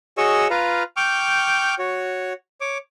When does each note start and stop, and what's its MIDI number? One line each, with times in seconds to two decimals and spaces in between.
0.18 0.48 66
0.18 0.48 68
0.18 0.48 73
0.18 0.48 75
0.18 0.48 85
0.18 0.48 88
0.50 0.83 65
0.50 0.83 71
0.50 0.83 77
0.50 0.83 82
0.97 1.75 79
0.97 1.75 85
0.97 1.75 86
0.97 1.75 89
0.97 1.75 91
1.79 2.33 66
1.79 2.33 73
2.61 2.78 73
2.61 2.78 86